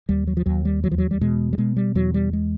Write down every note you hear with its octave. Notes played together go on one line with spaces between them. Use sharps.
D#2 G3
F#3
F3
D#2 F#3
G3
E2 F#3
F3
F#3
G3
B2 G#3
G3
B2 G#3
G3
E2 F#3
G3
G#3